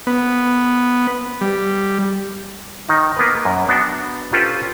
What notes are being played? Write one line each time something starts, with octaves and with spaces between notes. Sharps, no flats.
B3
G3
D#3 D#4
A#3 B3 A#4 B4
F#2
B3 D4 F#4 F#5 G5 A5
C#4 F4 G4 A4 B4 C5